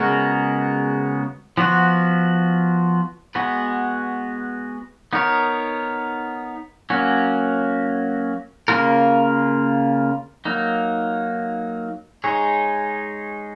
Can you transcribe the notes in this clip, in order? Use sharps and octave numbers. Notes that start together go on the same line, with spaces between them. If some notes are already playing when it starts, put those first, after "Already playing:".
Already playing: C#3 G#3 B3 F#4 A#4
F3 B3 F#4
G#3 B3 F#4 B4
B3 D#4 A#4 C#5
F#3 A#3 C#4 F#4
C#3 F3 A#3 F4 A#4
F#3 A#3 D#4
G#3 D#4 G#4 C#5